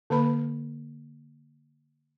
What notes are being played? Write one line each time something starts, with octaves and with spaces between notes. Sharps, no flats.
D3 A#3 B4 B5